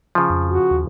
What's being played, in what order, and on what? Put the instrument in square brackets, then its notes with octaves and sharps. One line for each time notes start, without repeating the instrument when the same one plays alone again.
[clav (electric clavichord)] C#3 F3
[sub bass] F2
[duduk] F#4
[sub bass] D#2